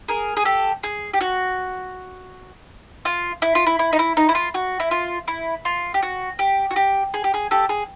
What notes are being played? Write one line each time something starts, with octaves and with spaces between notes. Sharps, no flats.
G#4 A#4
G#4
G4 A4
G#4
G4
F#4
F4
E4
F4
E4
E4
D#4
E4
D#4
E4
F4
F#4
E4
F4
E4
F4
G4
F#4
G4
F#4
G4
G#4
G4
G#4
G4 A4
G#4